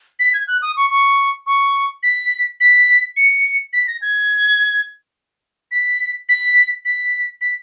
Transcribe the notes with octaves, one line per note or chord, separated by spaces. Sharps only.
B6
G#6
F#6
D#6
C#6
C#6
C#6
B6
B6
C#7
B6
A#6
G#6
B6
B6
B6
B6